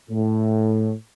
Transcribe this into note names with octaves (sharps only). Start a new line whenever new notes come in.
A2